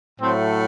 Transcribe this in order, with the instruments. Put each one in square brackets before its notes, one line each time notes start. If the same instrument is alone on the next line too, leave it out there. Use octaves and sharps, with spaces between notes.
[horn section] A2 F#3 A3 C4